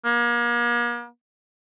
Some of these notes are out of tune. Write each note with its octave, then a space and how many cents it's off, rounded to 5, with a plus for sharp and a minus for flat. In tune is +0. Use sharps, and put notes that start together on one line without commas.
A#3 +40